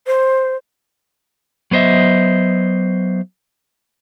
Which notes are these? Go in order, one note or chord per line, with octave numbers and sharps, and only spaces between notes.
C5
F#3 B3 C5 D#5 E5